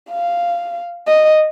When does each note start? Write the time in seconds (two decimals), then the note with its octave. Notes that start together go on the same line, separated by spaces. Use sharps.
0.10 F5
1.07 D#5